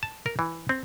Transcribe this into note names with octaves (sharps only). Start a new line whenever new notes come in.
A5
A#4
E3
C4